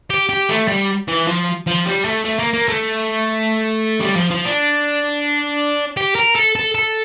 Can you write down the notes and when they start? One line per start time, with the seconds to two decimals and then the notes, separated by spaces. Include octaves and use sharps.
0.10 G4
0.29 G4
0.49 A3
0.68 G3
1.08 E3
1.27 F3
1.67 F3
1.86 G3
2.05 A3
2.25 A3
2.39 A#3
2.54 A#3
2.68 A3
4.01 G3
4.16 F3
4.30 F3
4.45 D4
5.97 G4
6.15 A#4
6.35 A4
6.55 A4
6.74 A4